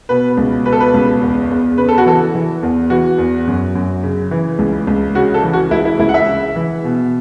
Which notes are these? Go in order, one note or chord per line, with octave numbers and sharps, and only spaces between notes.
B2 B4
C#2
B2 B4
A4
B4
C#2
E2
E2
C#3 B4
A4
F#4
E3 A4
E3
E2
E3 F#4
E2
F#2
F#2
C#3
E3
C#2
C#2
C#3 F#4
A4
E3
F#4
C#2 E4
E4
C#2 E4
F#5
E5
C#3
E3
B2